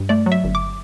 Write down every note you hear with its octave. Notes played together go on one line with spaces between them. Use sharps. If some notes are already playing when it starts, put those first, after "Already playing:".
Already playing: G2
A3 D5
F#3
E5
G1
D6